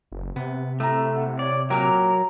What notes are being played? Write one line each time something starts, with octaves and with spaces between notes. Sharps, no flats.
F#1
C3 B3
A2 A3 A#5
F#5
C#5 D5
A#2 F#3 A#3 A#4 G5 A#5